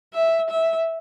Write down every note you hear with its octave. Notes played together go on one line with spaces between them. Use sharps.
E5
E5